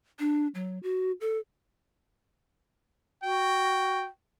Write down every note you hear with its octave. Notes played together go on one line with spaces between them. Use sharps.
D4
F#3
F#4
A4
F#4 G5